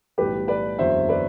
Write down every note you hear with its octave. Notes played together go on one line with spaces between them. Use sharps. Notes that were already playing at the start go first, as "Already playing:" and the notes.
B1 A2 E3 G3 G4 B4
B4 D5
F#1 E2 D3 F#3 C5 E5
B4 D5